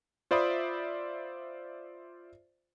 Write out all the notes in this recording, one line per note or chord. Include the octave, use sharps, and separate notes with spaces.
F4 C5 D5 E5 B5 D#6